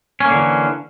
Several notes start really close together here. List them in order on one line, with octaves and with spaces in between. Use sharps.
C#4 A#3 D3 E3